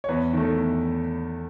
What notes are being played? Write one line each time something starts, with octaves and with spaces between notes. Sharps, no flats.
C#5
E2 B4
D#3 A3
E2